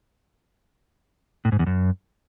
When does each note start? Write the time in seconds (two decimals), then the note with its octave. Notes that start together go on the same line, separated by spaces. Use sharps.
1.45 A2
1.52 G#2
1.59 E2
1.67 F#2